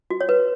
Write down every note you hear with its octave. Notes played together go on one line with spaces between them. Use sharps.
F#4
C#5
B4